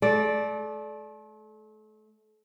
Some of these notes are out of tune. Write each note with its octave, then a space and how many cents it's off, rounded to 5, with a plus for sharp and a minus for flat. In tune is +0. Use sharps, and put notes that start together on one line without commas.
A3 -35 D5 +0